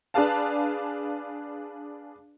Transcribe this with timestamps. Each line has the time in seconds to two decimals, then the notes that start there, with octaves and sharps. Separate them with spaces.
0.14 D4 G#4 B4 D5 F5 A5